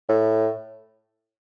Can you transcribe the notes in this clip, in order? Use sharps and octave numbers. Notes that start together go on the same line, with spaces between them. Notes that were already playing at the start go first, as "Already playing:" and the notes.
A2